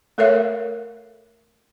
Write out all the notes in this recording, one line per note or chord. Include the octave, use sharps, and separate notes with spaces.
A3 A4 A#4 C#5 E5 F5